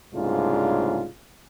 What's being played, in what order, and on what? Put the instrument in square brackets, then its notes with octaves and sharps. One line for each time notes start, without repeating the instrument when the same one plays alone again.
[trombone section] C2 G#2 C#3 A3 D4 F4